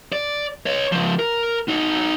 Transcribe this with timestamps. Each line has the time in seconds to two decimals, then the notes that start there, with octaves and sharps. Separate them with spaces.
0.12 D5
0.66 C#5 D#5
0.92 C#2 F3
1.19 A#4
1.68 D#4 F#4